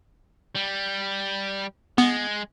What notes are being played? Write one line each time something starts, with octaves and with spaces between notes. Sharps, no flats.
G3
G#3 B3